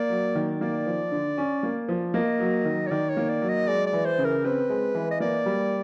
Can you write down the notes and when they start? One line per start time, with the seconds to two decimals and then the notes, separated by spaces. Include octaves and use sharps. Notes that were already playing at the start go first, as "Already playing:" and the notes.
Already playing: A#3 D5
0.10 F#3
0.35 D#3
0.61 A#3 D5
0.86 F3
1.12 D3
1.38 C#4
1.63 A#3
1.89 F3
2.14 A#3 D#5
2.40 F#3
2.65 D#3
2.87 C#5
2.90 D#3 D5
3.09 C#5
3.17 A#3
3.29 D5
3.42 F#3
3.48 D#5
3.67 G#3 D5
3.86 D5
3.93 E3
4.05 C5
4.18 C#3
4.25 A#4
4.44 C4 B4
4.69 G#3
4.95 E3
5.11 D#5
5.20 A#3 D5
5.46 G3